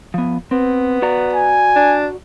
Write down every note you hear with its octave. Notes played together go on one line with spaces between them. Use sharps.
F3 B3
B3 C4
F#4 D5 A#5
G#5
D4